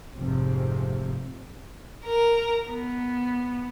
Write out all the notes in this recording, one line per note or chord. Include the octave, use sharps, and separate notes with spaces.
F1 G#2 C3 F3 C4
A#4
B3